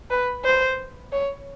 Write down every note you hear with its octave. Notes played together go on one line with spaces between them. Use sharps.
B4
C5
C#5